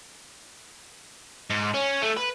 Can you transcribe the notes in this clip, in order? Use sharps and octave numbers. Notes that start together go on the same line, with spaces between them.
G#2
C#4
A3
B4